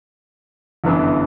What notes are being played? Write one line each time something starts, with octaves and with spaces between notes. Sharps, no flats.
G1 F#2 E3 B3 D4